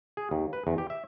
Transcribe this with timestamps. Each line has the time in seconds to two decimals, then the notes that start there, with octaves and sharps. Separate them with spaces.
0.17 G#4
0.31 D#2
0.53 B4
0.67 E2
0.78 G4
0.90 E5